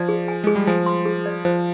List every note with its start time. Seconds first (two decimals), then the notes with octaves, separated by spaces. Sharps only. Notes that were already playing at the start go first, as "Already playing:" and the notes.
Already playing: F3 D5
0.09 G#4
0.28 G#5
0.44 G#3 G#4
0.56 G3
0.67 F3 G#5
0.86 C6
1.05 G#4
1.26 D5
1.45 F3 C5